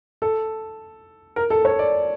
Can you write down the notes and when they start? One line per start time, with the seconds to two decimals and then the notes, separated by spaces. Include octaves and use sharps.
0.22 A4
1.36 A#4
1.50 A4
1.65 C#5
1.79 D5